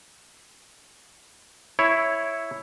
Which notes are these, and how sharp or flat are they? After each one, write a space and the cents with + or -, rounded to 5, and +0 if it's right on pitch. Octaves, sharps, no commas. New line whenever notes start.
E4 +0 C#5 +0